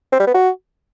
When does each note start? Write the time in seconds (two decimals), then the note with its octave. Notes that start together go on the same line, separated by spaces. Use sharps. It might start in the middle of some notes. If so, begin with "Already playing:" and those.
0.12 C4
0.20 G3
0.27 B3
0.34 F#4